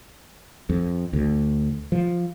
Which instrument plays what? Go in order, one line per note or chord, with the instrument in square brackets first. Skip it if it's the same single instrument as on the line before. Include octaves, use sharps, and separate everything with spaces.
[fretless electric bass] F2
D2
F3